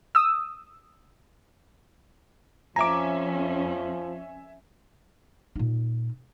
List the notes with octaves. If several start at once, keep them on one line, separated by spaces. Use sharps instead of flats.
D#6 E6
F2 F3 C#4 E5 G#5 A#5 D6
A#2 D#4